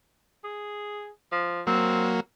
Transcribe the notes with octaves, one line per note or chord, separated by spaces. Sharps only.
G#4
F3
F#3 A#3 C4